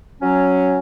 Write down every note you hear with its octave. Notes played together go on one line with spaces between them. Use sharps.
F#3 C#4